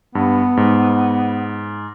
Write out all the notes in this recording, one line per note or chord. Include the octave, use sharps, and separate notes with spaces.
G2 B3
G#2